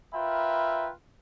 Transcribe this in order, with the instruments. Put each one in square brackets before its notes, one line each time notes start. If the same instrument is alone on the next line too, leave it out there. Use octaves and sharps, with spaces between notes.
[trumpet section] F4 A#4 B4 E5 G5 B5